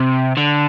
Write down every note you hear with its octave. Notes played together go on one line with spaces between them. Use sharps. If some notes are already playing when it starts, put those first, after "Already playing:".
Already playing: C3
D3